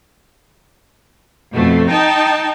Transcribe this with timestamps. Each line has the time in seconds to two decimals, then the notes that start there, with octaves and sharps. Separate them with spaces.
1.54 F2 B2 A3
1.89 D#4 G5 A5